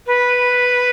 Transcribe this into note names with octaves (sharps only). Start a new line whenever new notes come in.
B4